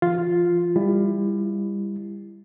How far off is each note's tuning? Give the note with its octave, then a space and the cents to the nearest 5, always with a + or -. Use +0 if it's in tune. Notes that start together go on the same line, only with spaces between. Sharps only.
F3 -40 F4 +0
G3 +30 E4 +25